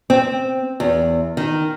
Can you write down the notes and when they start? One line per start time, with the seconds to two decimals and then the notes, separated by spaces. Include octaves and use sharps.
0.10 C4
0.80 E2
1.37 D#3